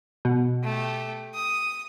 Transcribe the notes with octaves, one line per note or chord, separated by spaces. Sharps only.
B2
A3 G4
D#6